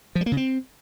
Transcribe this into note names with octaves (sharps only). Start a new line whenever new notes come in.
F3
G3
A#3
C#3
C4